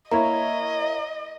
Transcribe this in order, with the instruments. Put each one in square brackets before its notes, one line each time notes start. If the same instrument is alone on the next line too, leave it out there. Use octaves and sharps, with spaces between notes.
[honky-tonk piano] A#3 E4 C#5 [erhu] D#5 [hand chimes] A#5